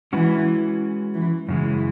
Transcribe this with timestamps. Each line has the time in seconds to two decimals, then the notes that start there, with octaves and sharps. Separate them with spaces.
0.13 E3 G#3 C#4 F#4 B4
1.14 E3
1.48 F#2 C#3 E3 G#3